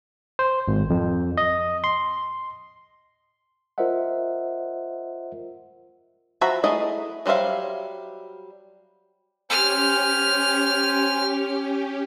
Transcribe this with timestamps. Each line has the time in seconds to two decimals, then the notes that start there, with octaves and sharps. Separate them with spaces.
0.39 C5
0.68 G#1
0.90 F2
1.38 D#5
1.84 C6
3.78 F4 A#4 C5 D#5 E5 F#5
6.41 F3 F#4 E5 A#5 B5
6.64 A3 E4 G#4 D#5
7.26 F#3 G3 C5 E5 F5
9.50 C#4 G4 C5 G#5 F6